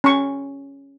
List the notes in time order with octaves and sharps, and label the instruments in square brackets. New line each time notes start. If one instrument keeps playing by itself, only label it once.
[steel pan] C#4 C#6